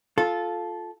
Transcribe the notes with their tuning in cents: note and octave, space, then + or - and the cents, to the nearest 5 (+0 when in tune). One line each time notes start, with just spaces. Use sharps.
F4 +5 A4 -15